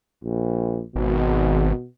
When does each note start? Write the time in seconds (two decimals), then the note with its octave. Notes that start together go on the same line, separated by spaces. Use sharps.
0.24 A#1
0.96 G#1 B2